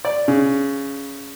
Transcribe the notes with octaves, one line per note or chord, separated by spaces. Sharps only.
D5
C#3